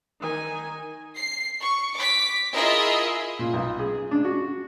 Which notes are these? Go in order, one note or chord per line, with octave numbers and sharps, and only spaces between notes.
D#3 G#5
C7
C#6
D6 B6
E4 F4 G#4 A#4 D#5 E5
A#2
B1
G#4
D4
F#4